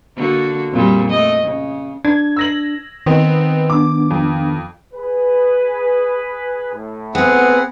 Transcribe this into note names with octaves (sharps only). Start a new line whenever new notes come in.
D3 A#3 F#4
F2 A#2 G3
A3 D#5
C#3
D4 G#6
E6 A#6 F#7
D#3 B3 C4 D#4
B3 D4 D6
F2
G#4 B4
A2
B3 C4 G#4 F#5